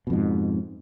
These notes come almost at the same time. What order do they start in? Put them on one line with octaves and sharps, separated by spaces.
B2 F2 G#2